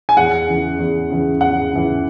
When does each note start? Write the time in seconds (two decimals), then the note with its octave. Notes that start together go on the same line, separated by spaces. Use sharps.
0.09 G#5
0.17 E2 F#5
0.48 C#3 E3
0.79 E2
1.10 C#3 E3
1.41 E2 F#5
1.72 C#3 E3